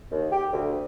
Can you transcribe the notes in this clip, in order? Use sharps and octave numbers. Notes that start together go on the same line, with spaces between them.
D#2
G4
D2